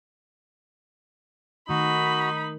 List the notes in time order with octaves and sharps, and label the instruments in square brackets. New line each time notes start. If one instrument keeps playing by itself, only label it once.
[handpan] D#3 A3 [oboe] D#4 [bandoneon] F#4 [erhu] B5